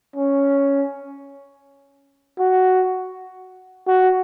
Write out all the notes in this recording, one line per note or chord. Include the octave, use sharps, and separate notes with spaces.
C#4
F#4
F#4